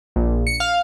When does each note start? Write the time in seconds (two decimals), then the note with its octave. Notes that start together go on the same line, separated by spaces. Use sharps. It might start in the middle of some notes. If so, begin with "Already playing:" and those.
0.16 A#1
0.47 C#7
0.60 F5